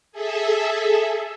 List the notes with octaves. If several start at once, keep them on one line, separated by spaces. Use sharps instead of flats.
G#4 A4 E5